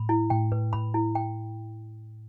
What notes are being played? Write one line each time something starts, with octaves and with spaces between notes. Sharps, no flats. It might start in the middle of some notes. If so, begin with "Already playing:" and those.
Already playing: A2 B5
E4
A2 G5
A2 B4
A2 B5
E4
G5